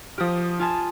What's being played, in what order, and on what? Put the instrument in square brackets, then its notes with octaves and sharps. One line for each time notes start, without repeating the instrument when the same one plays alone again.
[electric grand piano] F3 F6 [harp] G4 D#6
[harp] F4 G#5 A5